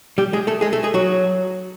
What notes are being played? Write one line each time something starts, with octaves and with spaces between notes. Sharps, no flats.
G3 G4
G#3 G#4
A3 A4
G#3 G#4
A3 A4
G#3 G#4
F#3 F#4